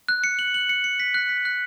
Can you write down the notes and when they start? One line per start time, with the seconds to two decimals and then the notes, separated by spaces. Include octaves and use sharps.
0.09 F#6
0.24 C#7
0.39 F#7
0.54 F#7
0.69 C#7
0.84 C#7
1.00 B6
1.14 F#6
1.29 B6
1.45 F#6